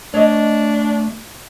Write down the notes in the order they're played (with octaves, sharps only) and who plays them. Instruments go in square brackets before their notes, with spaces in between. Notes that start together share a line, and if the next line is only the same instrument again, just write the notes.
[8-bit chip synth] A3 [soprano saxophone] D4 [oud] C#5 D#5